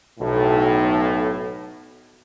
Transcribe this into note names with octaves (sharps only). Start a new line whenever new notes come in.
B1 A2